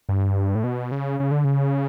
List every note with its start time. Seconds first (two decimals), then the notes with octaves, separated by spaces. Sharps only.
0.09 G2
0.55 A2
0.64 B2
0.92 C#3
1.20 C#3
1.31 D3
1.44 C#3